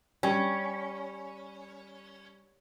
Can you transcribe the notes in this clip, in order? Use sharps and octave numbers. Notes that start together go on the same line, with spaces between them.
G3 C#4